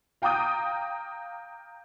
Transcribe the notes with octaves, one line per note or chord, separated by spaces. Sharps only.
F5 G5 A#5 D6 D#6 G6